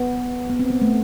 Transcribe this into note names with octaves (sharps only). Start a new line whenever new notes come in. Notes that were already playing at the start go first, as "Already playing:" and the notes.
Already playing: B3
B3
C4
B3
A3